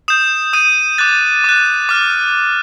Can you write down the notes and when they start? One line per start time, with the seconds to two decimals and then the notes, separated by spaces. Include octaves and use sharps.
0.08 D#6 G6 E7
0.53 D#6 G6 D#7
0.98 D6 F#6 A6
1.44 D6 F#6
1.89 D6 F6